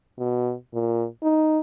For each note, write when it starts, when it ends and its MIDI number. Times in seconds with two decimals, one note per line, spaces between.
0.19 0.53 47
0.73 1.05 46
1.23 1.60 63